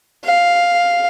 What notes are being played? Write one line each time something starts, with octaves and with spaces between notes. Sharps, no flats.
F5